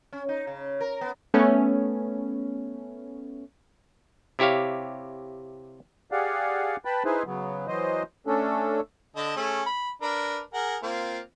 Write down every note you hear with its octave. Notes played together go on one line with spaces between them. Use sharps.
C#4
D#4
C#3
A#4
B3
A3 B3 C#4
C3 E4 G4 C#5 F5
G4 G#4 D5 F5 F#5
B4 G5 A5 B5
D#4 E4 G#4 B4 C5
C#3 F#3 B3
E3 F#3 C5 D#5
A3 C#4 D4 A4
D3 D#5 A5
A3 C#4 G#4
B5
D4 A#4 B4
G#4 A#4 F#5
A#3 C4 F4